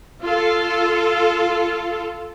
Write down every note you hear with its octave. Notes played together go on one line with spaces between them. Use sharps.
F4 A4